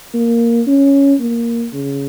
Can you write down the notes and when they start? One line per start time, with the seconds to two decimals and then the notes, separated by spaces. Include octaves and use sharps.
0.14 A#3
0.67 C#4
1.20 A#3
1.73 C#3